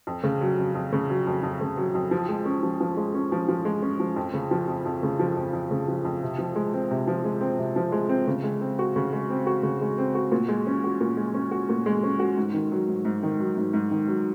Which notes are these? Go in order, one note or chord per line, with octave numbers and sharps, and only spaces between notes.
F2
C#3
F#3
F2
F2
C#3
F#3
F2
F2
C#3
F#3
F2
F3
G#3
C#4
F3
F3
G#3
C#4
F3
F3
G#3
C#4
F3
F2
C#3
F3
F2
F2
C#3
F3
F2
F2
C#3
F3
F2
C3
F3
G#3
C4
C3
F3
G#3
C4
C3
F3
G#3
C4
C#3
G#3
C4
F#4
C#3
G#3
C4
F#4
C#3
G#3
C4
F#4
A#2
G#3
C#4
F#4
A#2
G#3
C#4
F#4
A#2
G#3
C#4
F#4
G#2
D#3
F#3
G#2
G#2
D#3
F#3
G#2
G#2
D#3
F#3